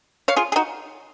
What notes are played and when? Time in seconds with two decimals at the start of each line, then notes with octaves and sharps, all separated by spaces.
0.28 C#5 F5
0.36 F4 G#4
0.52 G#4
0.56 D#4 F#4